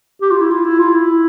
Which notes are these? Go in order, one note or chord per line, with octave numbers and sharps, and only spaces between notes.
G4
F4
E4
F4
E4
F4
E4